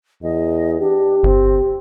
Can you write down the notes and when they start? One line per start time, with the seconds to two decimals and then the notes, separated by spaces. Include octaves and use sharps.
0.23 E2 D#5
0.80 D4 G4
1.23 G1 C4